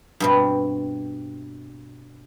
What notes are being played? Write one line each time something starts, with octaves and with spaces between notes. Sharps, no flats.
G2 B2 C4